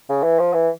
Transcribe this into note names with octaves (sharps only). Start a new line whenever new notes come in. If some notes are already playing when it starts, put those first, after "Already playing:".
C#3
E3
F3
E3